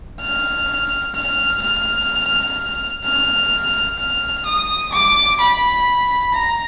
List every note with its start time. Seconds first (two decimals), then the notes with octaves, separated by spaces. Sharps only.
0.21 F6
1.15 F6
1.62 F6
3.04 F6
3.98 F6
4.46 D#6
4.93 D6
5.40 B5
6.34 A#5